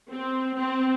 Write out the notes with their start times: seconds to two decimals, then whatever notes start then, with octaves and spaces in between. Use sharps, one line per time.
0.10 C4
0.58 C4